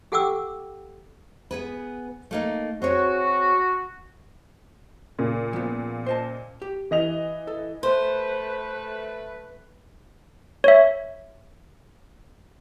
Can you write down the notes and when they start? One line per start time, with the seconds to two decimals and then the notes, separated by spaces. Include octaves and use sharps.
0.12 G4 A4 F#5 G5 D6 E6
1.51 B3 G#4 B4
2.31 A3 A#3 D#4
2.82 C4 F#4 G#4 C#5
5.19 A#2 C#3
5.53 F3 B3
6.06 C5 D#5 A5
6.62 G4
6.91 E3 D#5 F7
7.47 A4
7.83 A3 B4 C5
10.64 C#5 E5